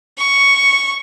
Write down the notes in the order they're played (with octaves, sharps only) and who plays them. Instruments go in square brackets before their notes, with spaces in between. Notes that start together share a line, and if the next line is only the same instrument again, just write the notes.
[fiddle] C#6